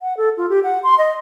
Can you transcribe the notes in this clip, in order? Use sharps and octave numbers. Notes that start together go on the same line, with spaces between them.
F#5
A4
F4
G4
F#5
C6
D#5